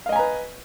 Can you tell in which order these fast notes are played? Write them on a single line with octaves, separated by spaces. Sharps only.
F5 D#5 G#5 A#5 B4